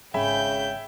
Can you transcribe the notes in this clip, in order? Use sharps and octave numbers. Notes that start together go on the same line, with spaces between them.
G#1 C#3 E5 G5 G#5 B5 G6